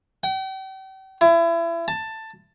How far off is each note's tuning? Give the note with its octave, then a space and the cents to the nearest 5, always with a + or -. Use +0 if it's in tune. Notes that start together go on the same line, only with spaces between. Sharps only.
G5 -40
E4 +30
A5 +10